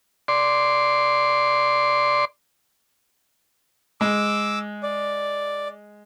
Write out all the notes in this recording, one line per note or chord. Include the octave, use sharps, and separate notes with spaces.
D5 C6
G#3 D6 E6
D5